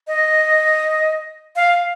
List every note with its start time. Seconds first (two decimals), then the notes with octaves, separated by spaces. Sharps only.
0.07 D#5
1.56 F5